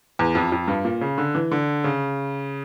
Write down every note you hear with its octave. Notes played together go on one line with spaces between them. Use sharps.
E2
F2
F2
G2
A#2
C#3
D3
E3
D3
C#3